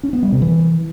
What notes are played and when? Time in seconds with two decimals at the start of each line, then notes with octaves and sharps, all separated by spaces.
0.03 C#4
0.13 B3
0.23 G3
0.32 C3
0.42 E3